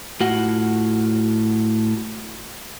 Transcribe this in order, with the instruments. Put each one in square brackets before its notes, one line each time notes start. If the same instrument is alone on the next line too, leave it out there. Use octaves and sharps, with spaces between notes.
[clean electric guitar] A2 F4 F#4 F#5